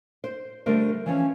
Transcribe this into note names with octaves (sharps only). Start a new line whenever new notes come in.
C5
D3 G3 A3 A#4 C5
E3 F3 C#4